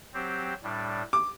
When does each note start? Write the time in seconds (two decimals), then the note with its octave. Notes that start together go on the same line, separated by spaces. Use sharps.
0.13 F#3 C4 G4 C5
0.63 A2 G3 D4
1.13 D6